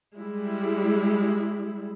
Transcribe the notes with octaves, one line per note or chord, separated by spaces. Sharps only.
G3 G#3 E4